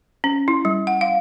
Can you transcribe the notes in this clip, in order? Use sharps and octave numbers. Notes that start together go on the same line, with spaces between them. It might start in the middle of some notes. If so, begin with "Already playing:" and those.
C#4
E4
G3
F#5
F5